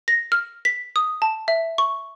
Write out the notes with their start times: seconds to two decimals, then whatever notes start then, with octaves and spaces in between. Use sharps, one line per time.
0.08 A#6
0.32 F6
0.65 B6
0.96 D#6
1.22 A5
1.48 E5
1.78 C#6